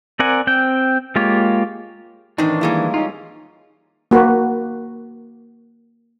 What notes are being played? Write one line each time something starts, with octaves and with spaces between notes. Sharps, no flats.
C4 A#4 D5 F#5 G#5
C4 G5
G#3 A#3 F4 G4 C#5
A2 D#3 E3 C4 D4 D#4
G3 G#3 A#3 E4
C#4 D#4 F4
A#3 F#4 B4